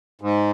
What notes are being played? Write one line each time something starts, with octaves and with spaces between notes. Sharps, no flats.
G#2